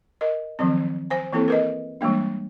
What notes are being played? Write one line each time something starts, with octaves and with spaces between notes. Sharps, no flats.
A#4 D#5
D#3 F3 F#3 C4
C5 G#5
E3 A#3 C4 E4 A4
A#4 B4 D#5
E3 G3 G#3 A#3 D4